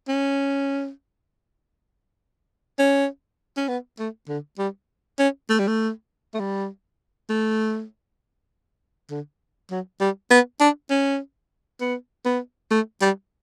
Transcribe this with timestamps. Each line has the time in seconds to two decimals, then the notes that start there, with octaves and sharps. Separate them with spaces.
0.08 C#4
2.79 C#4
3.57 C#4
3.68 B3
3.99 A3
4.29 D3
4.59 G3
5.19 C#4
5.49 A3
5.59 G3
5.68 A3
6.34 A3
6.39 G3
7.29 A3
9.11 D3
9.71 F#3
10.00 G3
10.31 B3
10.60 D4
10.90 C#4
11.81 B3
12.25 B3
12.71 A3
13.01 G3